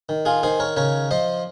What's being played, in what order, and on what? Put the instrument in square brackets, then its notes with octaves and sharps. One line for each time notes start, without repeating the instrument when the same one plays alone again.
[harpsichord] D#3
F4 G#4
D#3 G#4 C5
A#4 C#5
C#3 A#4 C#5
F3 C5 D#5